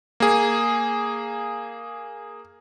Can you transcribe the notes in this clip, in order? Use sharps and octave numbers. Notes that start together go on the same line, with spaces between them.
A#3 G#4